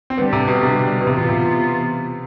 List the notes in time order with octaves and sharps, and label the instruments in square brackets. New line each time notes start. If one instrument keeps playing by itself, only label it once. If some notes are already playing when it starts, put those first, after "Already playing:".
[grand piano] C4
[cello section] D3 G3 D4 G4 [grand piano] B3
[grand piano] C3
B2
C3
B2
[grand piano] C3 [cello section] E3 B3 F4
[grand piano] C3
C3